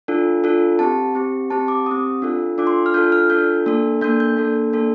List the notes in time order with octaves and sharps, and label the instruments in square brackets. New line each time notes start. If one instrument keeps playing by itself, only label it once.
[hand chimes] D4 F4 A4
D4 F4 A4
C4 G4 A5
C4 G4
C4 G4 A5
D6
C4 G4 D#6
D4 F4 A4
D4 F4 A4 D6
C6
F6
D4 F4 A4 G6
F6
D4 F4 A4 G6
A#3 D4 A4
A#3 D4 A4 G6
G6
A#3 D4 A4
A#3 D4 A4